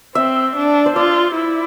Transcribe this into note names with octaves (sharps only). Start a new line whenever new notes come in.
C4 E5
D4
C5
F4 D5
E4